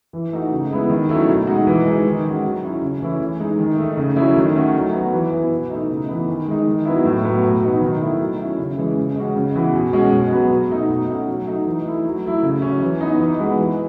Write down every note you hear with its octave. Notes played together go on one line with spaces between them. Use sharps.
E3
A3 D#4 F#4
C#3
G#3 B3 E4
D#3
F#3 A3 C#4 E4
B2
G#3 D#4 F#4
E3
G#3 D#4
D#3
G#3 C#4 F#4
F#3
C#4 E4
C#3
E3 A3 C#4 E4
E3
G#3 D#4
D#3
A3 D#4
C#3
F#3 A3 C#4 E4
D#3
A3 C#4 F#4
F#3
B3 F#4
E3
B3 E4
B2
A3 D#4
C#3
E3 B3
D#3
G#3 D#4
D#3
F#3 B3 E4
A2
F#3 B3 F#4
B2
F#3 B3 D#4 F#4
D#3
F#3 A3 E4
F#3
C#4 E4
C#3
E3 G#3 C#4
C#3
G#3 C#4 F#4
C#3
E3 B3 F#4
B2
G#3 C#4 F#4
B2
F#3 B3 F#4
B2
A3 D#4 F#4
B2
A3 C#4 F#4
F#3
A3 D#4 F#4
E3
A3 E4
F#3
A3 E4
C#3
F#3 C#4
E3
B3 D#4
E3
G#3 B3 F#4
E3